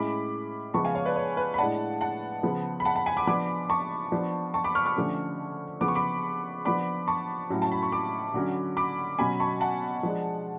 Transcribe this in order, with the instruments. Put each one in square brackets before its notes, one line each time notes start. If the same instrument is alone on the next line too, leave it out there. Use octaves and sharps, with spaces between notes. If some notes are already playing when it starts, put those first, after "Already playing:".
Already playing: [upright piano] A2 G#3 C#4 B5 D6
C#3 F3 G#3 B3 A5 C#6
F5 G#5
C#5 F5
B4 D5
C#5
B4
B5
A2 G#3 D4 F#5 A5
F#5 A5
C#3 F3 B3
B5
F#5 A5
F#5 A5
G#5 B5
B5 D6
F3 B3 D4 B5 D6
A5 C#6
F3 B3 D4
A5 C#6
B5 D6
C#6 F6
C#6 F6
D3 F3 A3 C#4
C#3 F3 B3 D6
C#6
B5 D6
F3 B3 D4 B5 D6
A5 C#6
A2 F#3 C#4
A5
B5
C#6
B5 D6
D3 F#3 C#4
B5 D6
B2 F#3 C#4 G#5 B5
A5 C#6
F#5 A5
F3 G#3 D4